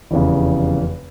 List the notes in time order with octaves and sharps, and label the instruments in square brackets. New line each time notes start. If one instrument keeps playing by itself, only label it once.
[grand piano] F1 E2 C#3